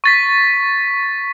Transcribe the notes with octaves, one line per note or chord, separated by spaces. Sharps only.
C#6 A6 B6